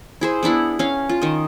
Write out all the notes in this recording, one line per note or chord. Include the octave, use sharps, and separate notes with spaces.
E4 G#4 C5
B3 D4 E4 F#5
C#4 F5
F4
D#3 D#5